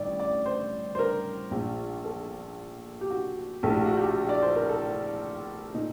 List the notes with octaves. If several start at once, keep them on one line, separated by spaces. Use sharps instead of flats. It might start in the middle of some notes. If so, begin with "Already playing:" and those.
Already playing: A1 G2 D#3 D5
D5
C5
C5
A#4
A#1 A#2
A4
G4
F#4
A#1 A2 A4
G4
F#4
G4
D5
C5
A#4
A4
A#2 D#4